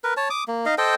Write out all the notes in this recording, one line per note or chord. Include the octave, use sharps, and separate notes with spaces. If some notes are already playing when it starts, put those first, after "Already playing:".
A#4 B4
C#5 A5
D6 D#6
A#3
D#4 D#5 F5
A4 C5 D#5 G5